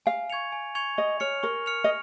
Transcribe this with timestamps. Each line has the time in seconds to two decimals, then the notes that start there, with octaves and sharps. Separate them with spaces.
0.06 F5 G#5
0.30 C#6 G#6 C#7 F7
0.52 G#5
0.75 C#6 G#6 C#7 F7
0.98 D#5 C#6
1.20 C#5 F6 C#7 F7
1.43 A#4 C#6
1.66 F6 C#7 F7
1.84 D#5